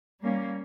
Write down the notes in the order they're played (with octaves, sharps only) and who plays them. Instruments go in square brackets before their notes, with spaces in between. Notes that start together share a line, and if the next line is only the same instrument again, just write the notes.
[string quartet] G3 A#3 C#4